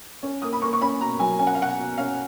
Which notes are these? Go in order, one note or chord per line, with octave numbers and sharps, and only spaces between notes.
C#4
A#3 D#6
B5
A#3 C#6
C#6
C#4 B5
B2 A#5
F#3 G#5
C#4 G#5
F#5
F5
B2 F#5
B2
C#4 F5